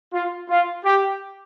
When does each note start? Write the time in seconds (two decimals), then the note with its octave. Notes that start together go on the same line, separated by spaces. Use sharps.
0.13 F4
0.50 F4
0.85 G4